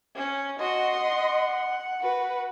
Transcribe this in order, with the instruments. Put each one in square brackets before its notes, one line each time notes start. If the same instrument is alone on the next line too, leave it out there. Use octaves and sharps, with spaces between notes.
[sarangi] C#4
[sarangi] F#4 [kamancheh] D#5 C6
[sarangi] F#5
[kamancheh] F#4 B4